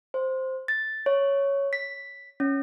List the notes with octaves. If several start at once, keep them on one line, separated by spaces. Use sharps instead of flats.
C5
A6
C#5
B6
C#4